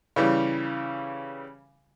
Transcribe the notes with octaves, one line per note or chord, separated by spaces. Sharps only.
C#3 E3 G3